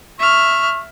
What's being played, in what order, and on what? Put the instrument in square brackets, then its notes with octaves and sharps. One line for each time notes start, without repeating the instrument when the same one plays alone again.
[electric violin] E5 F6 [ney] C#6